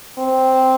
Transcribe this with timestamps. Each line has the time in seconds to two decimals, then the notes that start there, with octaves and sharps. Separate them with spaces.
0.18 C4